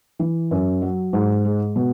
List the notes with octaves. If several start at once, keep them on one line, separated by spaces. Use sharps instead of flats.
E3
F#2
F#3
G#2
G#3
B2